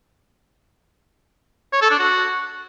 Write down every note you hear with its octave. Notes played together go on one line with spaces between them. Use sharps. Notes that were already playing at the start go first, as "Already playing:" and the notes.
C#5
A4
D4
F#4